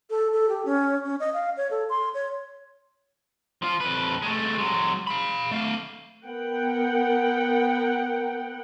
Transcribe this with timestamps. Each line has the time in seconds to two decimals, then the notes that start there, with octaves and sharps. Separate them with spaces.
0.10 A4
0.33 A4
0.49 G4
0.65 C#4
1.05 C#4
1.20 D#5
1.34 F5
1.57 C#5
1.71 A4
1.90 C6
2.14 C#5
3.62 F3 F4
3.80 F2 B4
4.22 G#3 A3
4.58 F#3 G#3
5.07 F5 B5
5.51 A3 F5
6.25 B3 A#4 F#5 G5